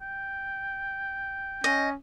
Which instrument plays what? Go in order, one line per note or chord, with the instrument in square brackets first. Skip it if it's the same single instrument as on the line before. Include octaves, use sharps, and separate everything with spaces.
[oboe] G5
[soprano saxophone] C#4 [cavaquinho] D#5